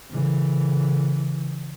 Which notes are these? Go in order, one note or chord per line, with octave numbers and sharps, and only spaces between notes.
C#3 E3